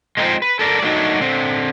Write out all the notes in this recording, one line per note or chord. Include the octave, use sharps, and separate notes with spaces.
G#3 A#3 C4 D#4 F4 C5
B4
A4 A#4 D5
F#3 A3 A#3 D4 D#4 F#4
D3 C4